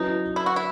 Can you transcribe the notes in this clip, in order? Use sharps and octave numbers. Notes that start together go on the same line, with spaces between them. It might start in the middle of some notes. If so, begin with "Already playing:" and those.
Already playing: F#3 C#4 D#4 E4 B4
E4
F#4
E4